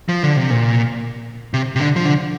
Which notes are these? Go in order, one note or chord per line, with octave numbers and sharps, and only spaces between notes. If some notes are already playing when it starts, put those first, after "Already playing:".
F3
D3
C3
A#2
C3
C3
D3
F3
D3